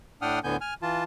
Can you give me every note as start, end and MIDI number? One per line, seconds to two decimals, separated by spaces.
0.22 0.39 45
0.22 0.39 62
0.22 0.39 78
0.22 0.39 79
0.22 0.39 87
0.22 0.39 89
0.44 0.57 38
0.44 0.57 45
0.44 0.57 50
0.44 0.57 59
0.44 0.57 80
0.44 0.57 91
0.61 0.74 80
0.61 0.74 89
0.82 1.04 52
0.82 1.04 65
0.82 1.04 81